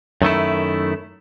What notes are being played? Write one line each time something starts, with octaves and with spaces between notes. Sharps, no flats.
F#2 D#3 A3 E4